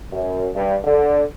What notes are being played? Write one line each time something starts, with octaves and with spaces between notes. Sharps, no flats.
F#2
G2
D3